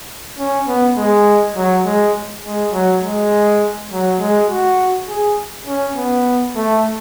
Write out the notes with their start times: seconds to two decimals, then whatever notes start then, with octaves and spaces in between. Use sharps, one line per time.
0.38 C#4
0.67 B3
0.97 G#3
1.56 F#3
1.85 G#3
2.44 G#3
2.73 F#3
3.02 G#3
3.91 F#3
4.20 G#3
4.49 F#4
5.09 G#4
5.67 C#4
5.96 B3
6.56 A3